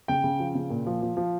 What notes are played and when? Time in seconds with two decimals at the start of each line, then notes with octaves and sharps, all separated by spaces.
0.08 C#3 G5
0.24 C#3
0.40 F3
0.55 C#3
0.70 A#2
0.87 F3
1.02 F3
1.17 F3